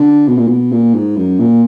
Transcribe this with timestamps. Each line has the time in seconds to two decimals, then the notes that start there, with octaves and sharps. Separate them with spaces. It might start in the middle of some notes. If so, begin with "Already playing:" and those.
Already playing: D3
0.28 B2
0.38 A#2
0.47 B2
0.72 A#2
0.95 G#2
1.17 F#2
1.40 A#2